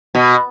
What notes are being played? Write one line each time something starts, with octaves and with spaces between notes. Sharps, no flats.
B2